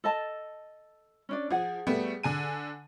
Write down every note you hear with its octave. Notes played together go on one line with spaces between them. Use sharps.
A4 D#5 A5
C#4 D4 D5
F3 G#4 F#5
G3 A3 B3
D3 G#5 D#7